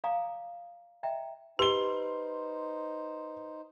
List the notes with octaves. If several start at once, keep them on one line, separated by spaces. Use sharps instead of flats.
D5 F5 G#5 A#5 D6 D#6
D#5 E5 G5 A#5
D#4 G4 B4 C5 C6 G7